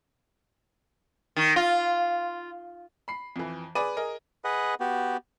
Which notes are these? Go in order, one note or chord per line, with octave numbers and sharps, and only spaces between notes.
D#3
F4
B5 C7
F2 E3
G#4 B4 D5 D#7
G#4 A#4 D#5
G#4 B4 D#5 F#5
B3 F#4 G4